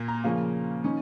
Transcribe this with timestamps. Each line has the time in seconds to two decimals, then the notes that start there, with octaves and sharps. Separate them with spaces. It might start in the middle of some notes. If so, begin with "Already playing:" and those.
Already playing: A#2 A#3
0.08 A#5
0.24 C#3 F3 A#3 C#4 F5
0.84 D#3 C#4